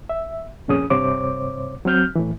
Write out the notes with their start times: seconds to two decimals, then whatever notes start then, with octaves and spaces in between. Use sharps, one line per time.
0.09 E5
0.68 C2 F2 A#2 C#4 G#4 D#6
0.90 G2 C3 C5 C#5 D6
1.85 F#3 C4 F6 G6
2.15 A2 E3